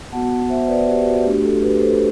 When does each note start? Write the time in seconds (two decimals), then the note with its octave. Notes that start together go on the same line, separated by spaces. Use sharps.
0.12 B3 F#4 F#5 A5
0.49 C5 E5
0.62 C5
0.68 B4 D5
0.87 G4
1.05 F#4
1.24 A3 D4 F#4 G4
1.43 F#4 A4
1.61 G4 B4
1.80 A4 C5